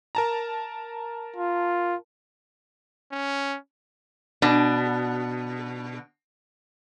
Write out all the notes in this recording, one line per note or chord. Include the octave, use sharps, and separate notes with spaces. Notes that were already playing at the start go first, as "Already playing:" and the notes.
A#4 A5 A#5
F4
C#4
B2 D4